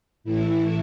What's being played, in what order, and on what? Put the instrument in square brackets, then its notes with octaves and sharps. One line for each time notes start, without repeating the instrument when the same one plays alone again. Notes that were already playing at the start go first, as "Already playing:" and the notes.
[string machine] A2 E3 A3 E4